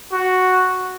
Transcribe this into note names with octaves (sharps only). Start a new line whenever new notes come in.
F#4